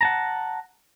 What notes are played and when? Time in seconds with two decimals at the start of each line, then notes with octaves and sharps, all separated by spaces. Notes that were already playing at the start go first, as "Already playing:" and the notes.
0.01 F#5 A5 A#5